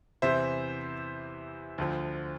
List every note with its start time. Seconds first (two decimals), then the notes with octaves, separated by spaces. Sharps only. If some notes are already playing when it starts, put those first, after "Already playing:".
0.22 E2 C3 E3 C5 E5
1.78 D2 D3 F3